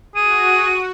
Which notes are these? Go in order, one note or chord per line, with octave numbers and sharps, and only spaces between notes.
F#4 G#4 D#7